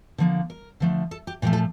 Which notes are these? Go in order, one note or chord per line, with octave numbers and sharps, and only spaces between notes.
D3 F3 A#3
A#4
D3 F3 A3
A4
G4
A#2 F3 A3 G4
A4